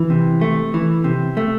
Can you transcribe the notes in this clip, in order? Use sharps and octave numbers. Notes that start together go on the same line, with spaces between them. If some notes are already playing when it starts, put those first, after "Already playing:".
Already playing: E3
C3
A3
E3
C3
A3